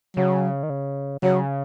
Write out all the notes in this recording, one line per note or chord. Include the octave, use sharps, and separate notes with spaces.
C#3 F#3
D#3
C#3
C#3 F#3